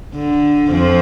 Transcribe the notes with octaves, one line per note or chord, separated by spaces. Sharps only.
D3
F2 F3